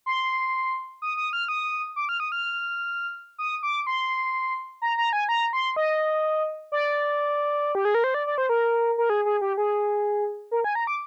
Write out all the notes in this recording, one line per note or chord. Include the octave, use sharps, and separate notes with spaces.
C6
D#6
D#6
F6
D#6
D6
F6
D#6
F6
D#6
D6
C6
A#5
A#5
G#5
A#5
C6
D#5
D5
G4
G#4
A#4
C5
D5
D5
C5
A#4
A#4
G#4
G#4
G4
G#4
A#4
G#5
A#5
D6